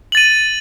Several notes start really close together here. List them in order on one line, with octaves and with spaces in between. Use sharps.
F#7 A6 D#7